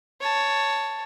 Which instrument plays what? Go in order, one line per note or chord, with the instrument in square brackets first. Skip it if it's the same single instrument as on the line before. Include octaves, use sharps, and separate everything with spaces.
[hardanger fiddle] C#5 A5